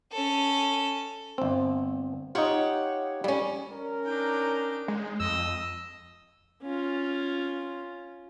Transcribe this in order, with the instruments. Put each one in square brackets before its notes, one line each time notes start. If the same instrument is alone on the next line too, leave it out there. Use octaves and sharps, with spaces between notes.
[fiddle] C#4 A4
[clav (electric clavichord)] G1 C4
[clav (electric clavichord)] D#4 F4 [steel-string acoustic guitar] G4 C#5 F#5
[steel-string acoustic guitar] F2 C#4 [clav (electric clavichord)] G3
[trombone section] C#4 A#4
[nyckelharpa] D4 G5 [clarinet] D#4
[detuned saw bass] G#3
[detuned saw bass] F2 [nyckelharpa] D#5 [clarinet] E6
[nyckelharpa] C#4 F4